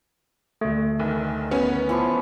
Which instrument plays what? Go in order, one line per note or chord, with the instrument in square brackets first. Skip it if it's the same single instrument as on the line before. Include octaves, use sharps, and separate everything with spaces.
[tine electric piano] D2 A3
[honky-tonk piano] F1 [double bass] D#3
[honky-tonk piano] B3 C#4
[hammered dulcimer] E3 F3 C#6